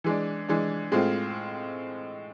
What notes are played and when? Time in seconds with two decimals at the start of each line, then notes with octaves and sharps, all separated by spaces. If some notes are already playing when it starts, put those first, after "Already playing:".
0.04 E3 G#3 D4
0.49 E3 G#3 D4
0.92 A2 G#3 C4 F4